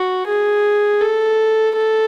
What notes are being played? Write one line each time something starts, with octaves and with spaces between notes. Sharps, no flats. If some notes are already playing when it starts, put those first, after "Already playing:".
Already playing: F#4
G#4
A4
A4